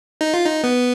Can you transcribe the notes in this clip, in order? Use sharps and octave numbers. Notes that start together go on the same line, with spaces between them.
D#4
F4
D#4
B3